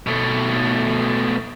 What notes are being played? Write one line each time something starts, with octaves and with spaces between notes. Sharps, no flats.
B2 A3